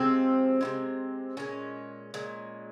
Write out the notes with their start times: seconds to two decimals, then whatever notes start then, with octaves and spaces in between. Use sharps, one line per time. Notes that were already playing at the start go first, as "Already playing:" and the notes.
Already playing: C3 F3 G#3 C4
0.61 C3 F3 G#3
1.37 A#2 G#3 C#4
2.14 A#2 G#3